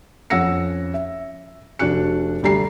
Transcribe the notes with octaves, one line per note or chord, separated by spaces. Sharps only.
F2 C#4 F#5 E6 A#6 C#7
E5
F1 D4 F#4 F#6 C#7
D2 G3 A#5 C7